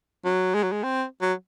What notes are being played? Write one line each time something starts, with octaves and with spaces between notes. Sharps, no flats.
F#3
G#3
F#3
G#3
C4
F#3